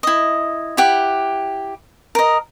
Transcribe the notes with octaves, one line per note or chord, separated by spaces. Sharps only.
E4 D#5
E4 G4 F#5
A#4 D#5